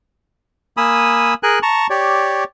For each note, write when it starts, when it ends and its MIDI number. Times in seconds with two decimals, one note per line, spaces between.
0.77 1.34 58
0.77 1.34 80
0.77 1.34 83
0.77 1.34 87
0.77 1.34 88
1.43 1.59 68
1.43 1.59 70
1.43 1.59 80
1.43 1.59 90
1.63 1.87 81
1.63 1.87 82
1.63 1.87 85
1.90 2.44 67
1.90 2.44 73
1.90 2.44 74